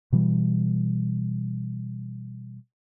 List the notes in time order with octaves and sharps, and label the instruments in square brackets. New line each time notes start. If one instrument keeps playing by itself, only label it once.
[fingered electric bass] B2 E3 G3